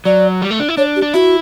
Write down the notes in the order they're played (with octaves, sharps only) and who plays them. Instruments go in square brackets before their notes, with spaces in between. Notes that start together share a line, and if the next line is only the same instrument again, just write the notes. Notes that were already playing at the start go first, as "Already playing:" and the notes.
[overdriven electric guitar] F#3 [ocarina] D5
[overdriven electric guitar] G3
A3
D4
E4
[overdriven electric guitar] D4 [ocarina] C#5
[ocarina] G4
[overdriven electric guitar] D4
[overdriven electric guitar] E4 [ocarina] F#4